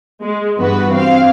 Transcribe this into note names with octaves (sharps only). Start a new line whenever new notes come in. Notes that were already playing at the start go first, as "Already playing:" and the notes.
G#3
G2 E3 B3 F#4 B4
C4 F5